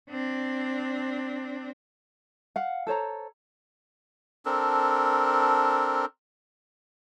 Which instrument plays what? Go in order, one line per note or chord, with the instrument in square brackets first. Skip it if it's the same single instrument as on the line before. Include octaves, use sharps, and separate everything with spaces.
[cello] C4 D4
[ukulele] F5 F#5
A4 C5 C#5 A#5
[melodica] C4 D4 A4 A#4